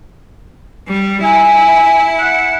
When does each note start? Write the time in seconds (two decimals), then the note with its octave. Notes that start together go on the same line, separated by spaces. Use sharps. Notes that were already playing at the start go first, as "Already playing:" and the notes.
0.88 G3
1.23 E4 G#5
2.19 F#5